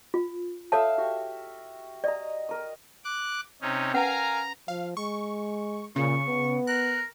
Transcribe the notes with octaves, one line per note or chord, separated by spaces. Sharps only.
F4
A4 C#5 E5 F5 A5 E6
F#4 G4
D5 D#5 A#5
A#4 D#6
D6 F#6
C3 C#4 D#4
C#4 A#4 B4 F5 F#5 G#5 A#5
F3 F5
G#3 C#6
A#2 C#3 C#6
B3
A#4 F#6